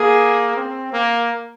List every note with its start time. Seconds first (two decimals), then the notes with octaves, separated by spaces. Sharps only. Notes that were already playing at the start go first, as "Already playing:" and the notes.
Already playing: A#3 G#4
0.57 C4
0.93 A#3